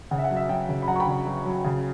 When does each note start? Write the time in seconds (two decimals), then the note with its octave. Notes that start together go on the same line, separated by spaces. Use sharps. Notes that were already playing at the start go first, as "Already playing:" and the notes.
0.11 C#3 F#5
0.18 E5
0.24 F#5
0.30 F#3
0.36 E5
0.49 F#3 E5 G5
0.69 C#3
0.82 B5
0.88 F#3 F#5 A#5
0.96 C#6
1.00 G5 B5
1.07 C#3
1.26 F#3
1.45 F#3
1.64 C#3